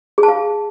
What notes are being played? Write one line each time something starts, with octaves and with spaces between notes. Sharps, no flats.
G#4
A5
F5